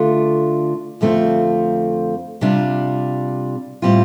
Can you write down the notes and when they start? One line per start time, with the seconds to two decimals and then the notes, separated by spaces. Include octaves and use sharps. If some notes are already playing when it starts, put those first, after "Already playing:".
Already playing: D3 A3 D4 F4
1.01 F2 D3 A3 C4 F4
2.41 C3 G3 D4 F4
3.82 A2 G3 C4 F4